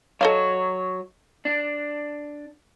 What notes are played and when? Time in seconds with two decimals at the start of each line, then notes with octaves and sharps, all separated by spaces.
0.21 F#3 A4 C#5 D#5 F5
1.45 D4